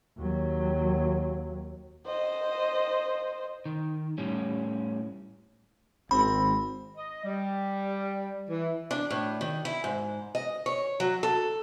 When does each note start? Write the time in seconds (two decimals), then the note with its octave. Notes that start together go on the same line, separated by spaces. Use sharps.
0.18 D#2 F#3
2.07 C5 D#5
3.66 D#3
4.18 A2 G3 C#4
6.11 G#1 C4 B5
6.97 D#5
7.24 G3
8.50 E3
8.91 D4
9.11 A2
9.41 D#3
9.65 E4
9.84 G#2
10.35 D#5
10.66 C#5
11.00 F#3
11.23 A4